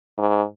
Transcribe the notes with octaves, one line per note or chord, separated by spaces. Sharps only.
G#2